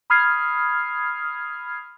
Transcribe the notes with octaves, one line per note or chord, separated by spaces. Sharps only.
B5 D#6 F6 G#6 C7